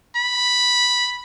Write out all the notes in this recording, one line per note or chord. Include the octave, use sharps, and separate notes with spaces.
B5